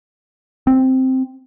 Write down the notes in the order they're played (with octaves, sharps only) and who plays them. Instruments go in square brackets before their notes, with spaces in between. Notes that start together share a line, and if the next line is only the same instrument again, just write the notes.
[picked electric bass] C4